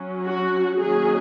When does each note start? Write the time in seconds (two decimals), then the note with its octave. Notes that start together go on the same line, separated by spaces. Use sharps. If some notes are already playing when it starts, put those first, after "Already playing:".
Already playing: F#3 C#4
0.25 F#4
0.80 D#3 F#3 A#3 C#4 G#4